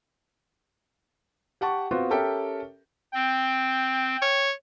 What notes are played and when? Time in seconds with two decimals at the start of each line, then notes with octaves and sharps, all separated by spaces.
1.61 G4 F#5 A5 C#6
1.91 B3 C4 F4 F#4
2.10 C#4 G4 A4 A#4 E5 G5
3.14 C4 G5
4.22 C#5